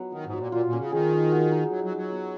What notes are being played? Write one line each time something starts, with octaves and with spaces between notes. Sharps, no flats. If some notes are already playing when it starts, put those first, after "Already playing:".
Already playing: F#3 B3 D#4
D#3 F#4
G#2
F#3
A#2
A#2 F4
A#2
C#4
C#3
D#3 G#4
D#5
F#4
D#4
F#3 C#5
F#3
D#4
F#3
B3